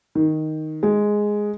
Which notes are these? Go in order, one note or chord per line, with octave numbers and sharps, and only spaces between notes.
D#3
G#3